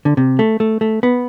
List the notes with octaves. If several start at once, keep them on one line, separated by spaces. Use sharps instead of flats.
D3
C3
A3
A3
A3
B3